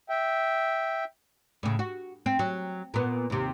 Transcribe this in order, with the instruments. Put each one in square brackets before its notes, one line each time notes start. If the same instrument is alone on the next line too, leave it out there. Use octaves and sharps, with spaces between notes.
[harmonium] E5 G5
[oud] A2 C#3
F#4
C4
F#3
A#2 B3
D#2 C3